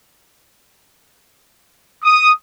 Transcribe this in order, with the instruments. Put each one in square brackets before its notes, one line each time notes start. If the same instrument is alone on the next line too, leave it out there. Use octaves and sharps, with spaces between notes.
[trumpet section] D#6